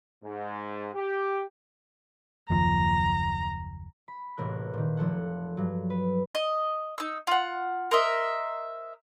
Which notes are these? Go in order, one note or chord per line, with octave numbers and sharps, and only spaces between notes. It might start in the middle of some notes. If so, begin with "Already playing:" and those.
G#2
G4
F#1 D#2 F3 A#5
B5
E1 A1 C3 A#4 F#6
A#2 D#3
F1 F3 A4 F#5
G2 F#3
B4
D#5
D#4 E6
F4 F#5
A#4 C5 D#5 E5